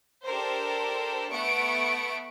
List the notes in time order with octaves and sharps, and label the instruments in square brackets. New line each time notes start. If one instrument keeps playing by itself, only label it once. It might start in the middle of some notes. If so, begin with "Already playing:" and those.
[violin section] D4 G4 A4 A#4 C5
A3 B3 F#5 C#6 D7